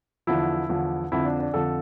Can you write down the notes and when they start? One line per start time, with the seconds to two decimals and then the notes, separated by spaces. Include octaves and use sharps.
0.27 E2 D3 F3 E4
0.69 E2 D3 F3
1.12 F2 D3 F3 E4
1.25 D4
1.40 D4
1.54 F2 D3 F3 A4